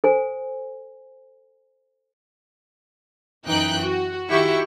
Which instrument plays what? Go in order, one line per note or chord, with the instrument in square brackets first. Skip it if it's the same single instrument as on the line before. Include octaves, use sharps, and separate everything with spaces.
[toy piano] A4 C5 G#5
[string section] F#2 E3 D#4 G5 F#6
F#4
D#3 E4 F#4 G4 E5 C#6